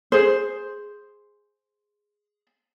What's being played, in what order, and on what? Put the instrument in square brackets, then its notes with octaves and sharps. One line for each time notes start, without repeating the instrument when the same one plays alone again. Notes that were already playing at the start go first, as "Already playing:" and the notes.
[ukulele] G#4 C5